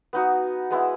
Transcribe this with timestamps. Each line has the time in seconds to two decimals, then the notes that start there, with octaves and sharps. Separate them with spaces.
0.13 B3 D#4 F#4
0.70 G#3 B3 E4